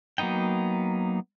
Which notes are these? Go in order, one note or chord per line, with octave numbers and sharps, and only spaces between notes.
F#3 A#3 B3 D#4 G5